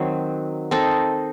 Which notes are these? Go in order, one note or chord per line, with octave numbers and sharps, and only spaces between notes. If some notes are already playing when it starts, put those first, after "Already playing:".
Already playing: D#3 F#3 C4
C4 D#4 A4